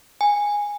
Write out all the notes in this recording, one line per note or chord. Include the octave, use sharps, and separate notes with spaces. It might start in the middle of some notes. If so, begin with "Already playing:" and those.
G#5